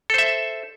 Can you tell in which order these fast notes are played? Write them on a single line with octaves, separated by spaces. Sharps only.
A4 C5 E5